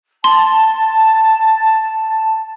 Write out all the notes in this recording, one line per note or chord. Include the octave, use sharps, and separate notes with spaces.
A5 C6